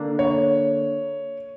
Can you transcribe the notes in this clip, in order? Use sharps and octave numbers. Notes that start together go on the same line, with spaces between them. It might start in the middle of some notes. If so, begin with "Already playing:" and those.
Already playing: D3 A#3 D4
C#5